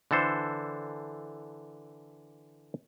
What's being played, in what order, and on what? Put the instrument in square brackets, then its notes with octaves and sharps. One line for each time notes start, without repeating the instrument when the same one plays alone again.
[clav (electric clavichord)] D3 E3 A4 C5